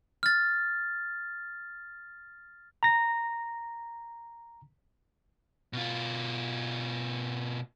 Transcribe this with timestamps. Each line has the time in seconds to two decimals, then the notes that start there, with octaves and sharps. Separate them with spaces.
0.23 F6 A6
2.83 A#5 A#6
5.73 B2 F4